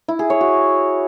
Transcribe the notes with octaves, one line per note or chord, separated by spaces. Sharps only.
E4
G#4
C#5
F#4